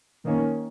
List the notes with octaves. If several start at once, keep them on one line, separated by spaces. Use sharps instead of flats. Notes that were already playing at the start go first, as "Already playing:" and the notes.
D#3 A#3 C#4